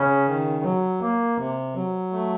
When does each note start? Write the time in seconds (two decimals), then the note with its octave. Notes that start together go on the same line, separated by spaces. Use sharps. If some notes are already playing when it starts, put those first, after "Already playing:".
Already playing: C#3 C#4
0.27 D#3
0.64 F#3
1.01 A#3
1.38 C3
1.75 F#3
2.12 A3